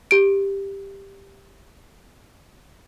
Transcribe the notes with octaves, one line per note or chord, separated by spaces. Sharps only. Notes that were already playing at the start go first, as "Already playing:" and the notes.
G4 D7